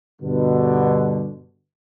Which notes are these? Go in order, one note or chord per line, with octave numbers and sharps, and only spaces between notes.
G2 B2 D3